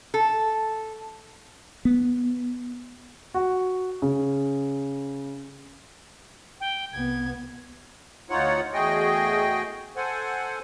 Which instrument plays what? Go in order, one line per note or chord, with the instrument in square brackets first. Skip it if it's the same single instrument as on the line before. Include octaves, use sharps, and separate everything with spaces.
[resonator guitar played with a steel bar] A4
[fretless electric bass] B3
[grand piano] F#4
C#3
[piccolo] G5
[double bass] C2 B3 [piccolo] G#6
[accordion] D2 D#4 F4 C#5 F#5
E2 A3 F#4 G#4 D#5 G5
A4 C5 F#5 G#5